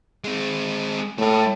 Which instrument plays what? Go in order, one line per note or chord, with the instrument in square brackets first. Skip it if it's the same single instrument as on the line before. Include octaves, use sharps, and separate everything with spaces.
[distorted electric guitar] G#3 C4
[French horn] A2 [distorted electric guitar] A3 G5